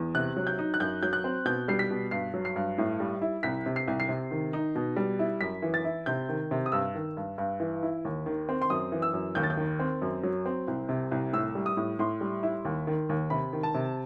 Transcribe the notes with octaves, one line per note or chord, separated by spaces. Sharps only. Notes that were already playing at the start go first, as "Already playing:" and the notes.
Already playing: E2
C3 F#6
F#3
G6
D#4
F#6
F#2 G6
F#3 G6
F#6
C4
B2 G6
G3 C7
B6
B2
G2 C7
F#3
C7
G2
A2
G3
E4
C2 B6
C3
C7
C2
C7
C3
D#3
D#4
B2
G3
E4
F#2 B6
E3
A6
E4
C3 G6
D#3
C3
D#6
G2 E6
D#3
G2
G2
E3
E4
D#2
D#3
C4
C6
F#2 D#6
E3
E6
F#2
D#2 G6
A6
G6
D#3
C4
F#2
F#3
C4
C2
C3
C2
A2 E6
G3
D#6
A2
A2 C6
G3
E4
D#2
D#3
D#2
C3 B5
D#3
A5
C3